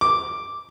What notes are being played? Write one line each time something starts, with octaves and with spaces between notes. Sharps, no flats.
D6